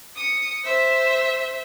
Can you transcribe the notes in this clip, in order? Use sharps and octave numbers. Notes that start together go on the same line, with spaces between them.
D#6 C#7
C5 E5